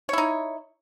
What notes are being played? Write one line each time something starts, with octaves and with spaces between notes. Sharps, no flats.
D#4 E4 C#5